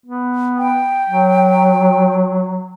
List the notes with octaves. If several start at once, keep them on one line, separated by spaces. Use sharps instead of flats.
B3
G5
F#3